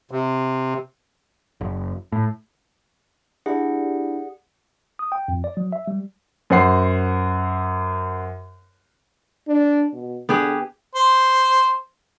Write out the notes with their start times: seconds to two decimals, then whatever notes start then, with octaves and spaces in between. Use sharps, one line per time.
0.11 C3
1.61 F#1
2.12 A2
3.46 D4 E4 G4 G#4 D5 F#5
4.99 D#6
5.12 G5
5.28 F2
5.44 D5
5.57 F#3
5.73 E5
5.87 G3
6.50 F#2 C5 F#5 C7
9.47 D4
9.93 B2
10.29 D3 B3 G4 G#4
10.95 C5